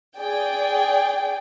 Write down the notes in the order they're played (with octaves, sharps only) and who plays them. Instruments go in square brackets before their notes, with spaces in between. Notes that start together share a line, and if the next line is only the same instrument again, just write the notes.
[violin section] G#4 D5 G5